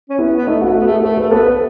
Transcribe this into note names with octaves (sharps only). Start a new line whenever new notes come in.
C#4
B3 E4
B3
A3 D#4
F#4
A3
F#4
B3
A3
G#4
A3 A4
A3 B4
B3 A4
B4